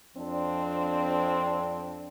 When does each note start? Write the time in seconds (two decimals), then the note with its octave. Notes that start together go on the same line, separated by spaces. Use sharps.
0.17 F2 F3 C4 D4